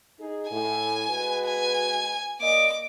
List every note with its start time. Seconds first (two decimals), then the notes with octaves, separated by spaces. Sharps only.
0.20 D#4 G#4
0.51 A2 G#5
1.10 G#3 F#4 B4
1.46 G#5
2.41 A#3 D5 D#5 D6